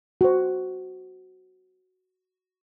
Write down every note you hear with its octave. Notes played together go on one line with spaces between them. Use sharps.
F#4 C5